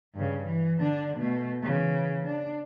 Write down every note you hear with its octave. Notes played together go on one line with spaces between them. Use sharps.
G2 C#3
E3
D3 D4
B2 A3
C#3 E3
D4